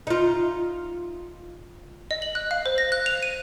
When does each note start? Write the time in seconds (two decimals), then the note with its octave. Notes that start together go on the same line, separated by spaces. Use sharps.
0.07 D#4 F4
2.11 D#5
2.22 F#7
2.35 F#6
2.51 F5
2.66 C5
2.78 A#6
2.92 F#6
3.06 F7
3.23 D#7